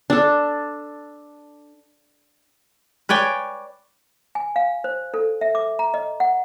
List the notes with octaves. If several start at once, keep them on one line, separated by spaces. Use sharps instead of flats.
D4 A4
B4 C#5 D5 G5 G#5
G#5
F5
C5
A4
E5
D6
A#5
D#5
F#5